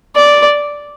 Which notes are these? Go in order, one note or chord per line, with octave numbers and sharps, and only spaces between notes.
D5